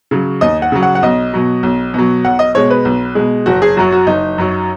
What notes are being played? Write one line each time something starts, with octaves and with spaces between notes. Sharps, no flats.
C#3 F#3
D#2 D#5
F#5
C#3 F#3
F#5
F#5
B1 D#5
B2 F#3
B1
B2 F#3
B1 F#5
D#5
B2 G#3 C#5
B4
B1
B2 G#3
F#1 F#4
G#4
F#2 F#3 F#4
F#4
F#1 D#4
F#2 F#3